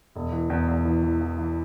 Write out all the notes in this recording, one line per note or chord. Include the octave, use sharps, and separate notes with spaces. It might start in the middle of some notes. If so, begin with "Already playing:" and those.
E1
E3
E2
E2
E3
E3
E3
E3